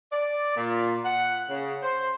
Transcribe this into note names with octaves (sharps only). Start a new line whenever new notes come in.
D5
A#2
F#5
C#3
C5